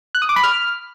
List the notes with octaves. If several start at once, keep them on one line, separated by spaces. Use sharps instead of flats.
F#6
D#6
D6
B5
F6